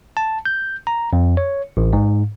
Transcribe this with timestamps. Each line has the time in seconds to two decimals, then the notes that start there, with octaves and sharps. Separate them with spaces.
0.17 A5
0.45 G6
0.87 A#5
1.13 F2
1.37 C#5
1.77 A1
1.93 G#2